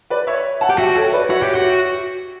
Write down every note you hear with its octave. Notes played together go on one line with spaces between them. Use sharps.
B4 D5
C#5 E5
F#5 A5
G4
F#4 E5 G5
A4 C#5
B4 D5
F#4 C#5 E5
G4
F#4